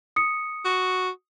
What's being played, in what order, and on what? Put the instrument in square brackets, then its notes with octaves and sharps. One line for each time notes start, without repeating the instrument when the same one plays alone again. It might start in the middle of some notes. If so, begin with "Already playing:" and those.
[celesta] D#6 C#7
[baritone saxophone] F#4